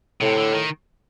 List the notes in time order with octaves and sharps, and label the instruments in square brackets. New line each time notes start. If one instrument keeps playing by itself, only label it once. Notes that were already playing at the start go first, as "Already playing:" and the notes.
[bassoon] A2 [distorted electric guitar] C3
[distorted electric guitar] D3
D#3